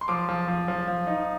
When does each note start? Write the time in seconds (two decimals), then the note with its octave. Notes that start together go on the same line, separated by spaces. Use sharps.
0.01 C6
0.08 F3 D6
0.29 F3
0.48 F3
0.68 F3
0.88 F3
1.07 D#4